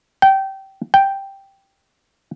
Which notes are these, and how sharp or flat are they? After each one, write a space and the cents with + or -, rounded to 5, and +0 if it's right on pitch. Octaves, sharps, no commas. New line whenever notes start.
G5 -20
G5 +0